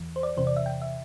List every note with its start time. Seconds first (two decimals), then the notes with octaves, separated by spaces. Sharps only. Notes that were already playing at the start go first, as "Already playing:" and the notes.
Already playing: E2 E3
0.16 C5
0.23 D5
0.37 E2 C3 E3 C5
0.47 D5
0.56 E5
0.66 G5
0.82 E5